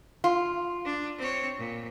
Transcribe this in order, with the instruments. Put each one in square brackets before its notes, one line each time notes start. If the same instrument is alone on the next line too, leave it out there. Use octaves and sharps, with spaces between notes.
[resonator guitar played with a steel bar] F4
[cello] D4
C4 C#5
A#2